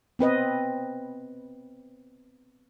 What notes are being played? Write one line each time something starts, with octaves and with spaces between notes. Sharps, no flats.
B3 C4 B4 D#5